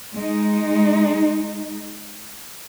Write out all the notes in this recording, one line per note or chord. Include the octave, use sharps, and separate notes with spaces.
G#3 D#4